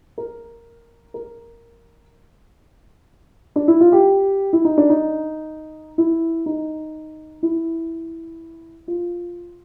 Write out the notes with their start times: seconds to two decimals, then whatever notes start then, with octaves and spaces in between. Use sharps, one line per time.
0.18 A#4
1.14 A#4
3.56 D4
3.68 E4
3.81 F4
3.92 G4
4.53 E4
4.65 D#4
4.78 D4
4.90 D#4
5.98 E4
6.46 D#4
7.43 E4
8.88 F4